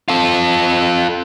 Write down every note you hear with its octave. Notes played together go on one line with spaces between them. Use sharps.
F4 A4